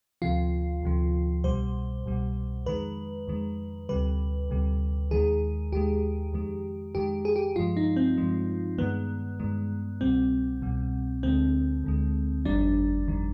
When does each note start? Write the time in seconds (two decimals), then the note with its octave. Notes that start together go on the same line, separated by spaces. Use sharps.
0.22 D2 C3 F3 F4
0.83 D2 C3 F3
1.44 C2 B2 G3 C5
2.05 C2 B2 G3
2.66 F2 D#3 G#3 B4
3.28 F2 D#3 G#3
3.89 D2 C3 G3 B4
4.50 D2 C3 G3
5.11 D#2 D#3 G#3 G#4
5.72 D#2 D#3 G#3 G4
6.33 F2 D#3 G#3
6.95 F2 D#3 G#3 G4
7.25 G#4
7.36 G4
7.56 G2 F3 G#3 F4
7.77 D#4
7.96 C4
8.17 G2 F3 G#3
8.78 G2 D#3 G#3 B3
9.40 G2 D#3 G#3
10.01 C2 B2 G3 C4
10.62 C2 B2 G3
11.23 D2 D3 G#3 C4
11.84 D2 D3 G#3
12.45 G1 F2 D#3 G3 D4
13.07 G1 F2 D#3 G3